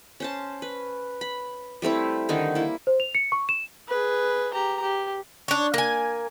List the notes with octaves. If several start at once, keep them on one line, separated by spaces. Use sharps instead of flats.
C#4 C5 A5
B4
B5
G3 A3 C4 E4
D3 D#3 D#4
A#3 E4
C5
F7
C#7
C#6
E7
G#4 B4
G4 A#5
G4
D4 C#5
A#3 G#5